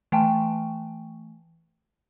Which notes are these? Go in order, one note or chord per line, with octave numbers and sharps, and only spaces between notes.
E3 A3 G5 A5